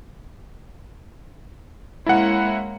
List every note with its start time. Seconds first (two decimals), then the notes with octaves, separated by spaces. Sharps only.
2.06 G#3 A#3 C#4 E4 F#5